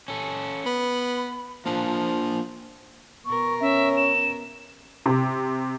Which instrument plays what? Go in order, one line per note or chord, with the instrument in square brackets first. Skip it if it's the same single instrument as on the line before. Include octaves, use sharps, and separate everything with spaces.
[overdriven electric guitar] C#4 A4
[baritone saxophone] B3 [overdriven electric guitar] B5
[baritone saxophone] F3 [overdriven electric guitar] A#3 D4
[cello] B2 A#4 [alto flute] C#6
[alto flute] C#4 [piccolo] E5
[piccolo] E7
[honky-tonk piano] C3